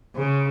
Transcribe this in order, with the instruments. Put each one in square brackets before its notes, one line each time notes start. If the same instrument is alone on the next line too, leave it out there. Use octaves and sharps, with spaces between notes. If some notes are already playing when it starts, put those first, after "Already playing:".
[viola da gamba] C#3